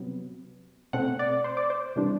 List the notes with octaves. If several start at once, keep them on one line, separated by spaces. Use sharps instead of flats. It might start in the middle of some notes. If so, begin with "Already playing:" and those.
Already playing: C3 F#3 B3
B2 A3 C4 F#5
D5
C5
D5
C5
C3 E3 G3 D4